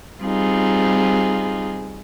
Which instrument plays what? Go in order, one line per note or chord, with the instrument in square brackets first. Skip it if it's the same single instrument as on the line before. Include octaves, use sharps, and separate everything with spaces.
[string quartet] G3 C4 D#4 F4 G#4